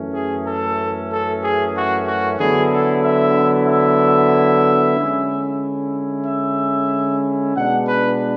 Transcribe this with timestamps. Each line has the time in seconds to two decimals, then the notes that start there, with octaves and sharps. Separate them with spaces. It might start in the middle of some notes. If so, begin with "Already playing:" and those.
Already playing: F#2 E3 A3 C#4
0.13 G#4
0.45 A4
1.10 A4
1.42 G#4
1.75 F#4
2.07 F#4
2.39 D3 F#3 B3 E4 G#4
2.71 A4
3.03 E5
3.68 E5
4.98 D3 G#3 C#4 E4
6.26 E5
7.55 B2 G#3 D4 F#5
7.87 B4